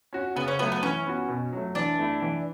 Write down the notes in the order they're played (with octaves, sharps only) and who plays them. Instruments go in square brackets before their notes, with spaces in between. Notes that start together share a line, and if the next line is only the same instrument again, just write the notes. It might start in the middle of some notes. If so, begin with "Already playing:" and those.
[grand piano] C#4 F#4
[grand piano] C#3 [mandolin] B3
[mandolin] C#4
[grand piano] F#3 A3 [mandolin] B3
[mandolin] B3
[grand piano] E3 [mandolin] C#4
[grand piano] B3 F#4
B2
F#3 A3
[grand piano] E3 [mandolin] D4
[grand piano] A3 E4
E3